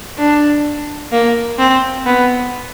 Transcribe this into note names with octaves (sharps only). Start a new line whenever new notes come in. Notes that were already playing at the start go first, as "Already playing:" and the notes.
D4
A#3
C4
B3